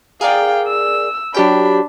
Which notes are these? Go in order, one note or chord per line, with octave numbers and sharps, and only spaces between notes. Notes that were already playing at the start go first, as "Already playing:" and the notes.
G#4 A#4 D5 F5 G5
E6
F#3 D4 G4 G5 B5